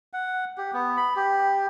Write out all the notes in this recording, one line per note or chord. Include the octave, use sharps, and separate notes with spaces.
F#5
G4
B3
B5
G4